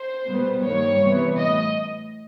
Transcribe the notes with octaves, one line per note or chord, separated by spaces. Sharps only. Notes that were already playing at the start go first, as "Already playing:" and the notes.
Already playing: C5
B2 G3 B3
G2 D#3 G3 A#3 C#5
C3 E3 G3 B3
A2 D#5